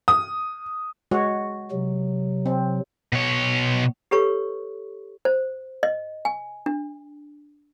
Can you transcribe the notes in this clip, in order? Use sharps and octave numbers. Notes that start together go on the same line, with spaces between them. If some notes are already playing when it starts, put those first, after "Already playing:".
D#6
G#3 F#4 C#5
C3 F#3
C4
B2 C#5
G4 A4 B4 C#5 C#6
C5
D#5
G#5
D4